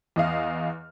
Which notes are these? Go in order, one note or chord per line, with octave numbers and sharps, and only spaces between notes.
E2 D#5 F5 F6